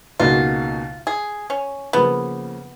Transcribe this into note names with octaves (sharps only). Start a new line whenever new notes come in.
C#2 B2 A#3 D#4 F4 F#4
G#4
C#4
C#3 F3 A#3 B3